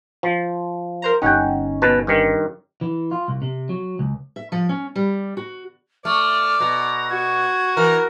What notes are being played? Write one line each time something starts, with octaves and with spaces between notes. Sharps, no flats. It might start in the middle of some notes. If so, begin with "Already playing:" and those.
F3
A#4 C5 A#5
G1 C#4 D#4 F#5 G5
B2 B4 A5
G2 D#3
E3
F4
C2
C3
F#3
C#2
E5
F3
C#4
G3
F#4
A3 D5 F6
B2 A#5
F#4 G#6
E3 A#4 A#5